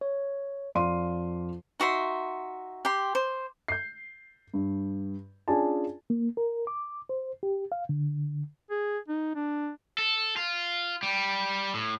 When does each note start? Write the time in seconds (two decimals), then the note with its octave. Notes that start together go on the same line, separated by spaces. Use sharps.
0.01 C#5
0.75 F2 D5 F5 C6 D#7
1.80 D#4 F#4 E5 C6
2.85 G4 C6
3.15 C5
3.68 G6 C7
4.54 G2
5.48 C#4 D4 F4 G#4 G#5 A5
6.10 A#3
6.37 A#4
6.67 D6
7.09 C5
7.43 G4
7.72 F5
7.89 D3
8.71 G#4
9.08 D#4
9.36 D4
9.98 A4
10.37 F4
11.03 G3
11.74 A2